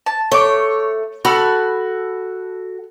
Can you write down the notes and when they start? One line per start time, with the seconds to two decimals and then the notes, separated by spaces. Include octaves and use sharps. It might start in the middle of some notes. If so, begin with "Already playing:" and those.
0.06 A5
0.32 A3 C#5 D6
1.25 F#4 A4 B5 F6